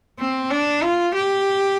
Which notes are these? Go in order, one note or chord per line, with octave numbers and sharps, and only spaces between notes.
C4
D4
F4
G4